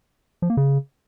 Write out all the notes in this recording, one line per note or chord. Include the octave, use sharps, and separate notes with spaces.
F3
A#3
C#3